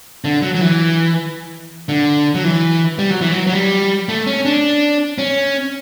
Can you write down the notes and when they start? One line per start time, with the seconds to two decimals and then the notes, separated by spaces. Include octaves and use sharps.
0.24 D3
0.42 F#3
0.54 F#3
0.61 E3
1.89 D3
2.35 F#3
2.44 E3
2.99 G3
3.10 F#3
3.21 E3
3.32 F#3
3.47 F#3
3.53 G3
4.09 A3
4.27 C#4
4.45 D4
5.18 C#4